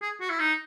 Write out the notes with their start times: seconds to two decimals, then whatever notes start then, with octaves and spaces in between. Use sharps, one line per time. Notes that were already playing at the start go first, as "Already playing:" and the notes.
0.02 G#4
0.21 F#4
0.30 E4
0.40 D#4